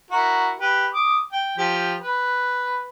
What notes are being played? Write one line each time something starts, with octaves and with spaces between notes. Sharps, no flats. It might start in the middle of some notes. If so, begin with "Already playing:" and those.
E4 F#4 A#4
G4 B4
D6 D#6
G5
F3 G4
B4